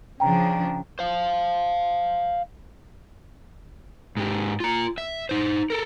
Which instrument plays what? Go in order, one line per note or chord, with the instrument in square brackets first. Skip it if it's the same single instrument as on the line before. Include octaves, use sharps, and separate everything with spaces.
[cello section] C#3 F3 D4 [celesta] G5 A#5
[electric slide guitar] C5 F5
[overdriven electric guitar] G#2 G4
F4 A#5
E5
D#4 C5
A4 A#4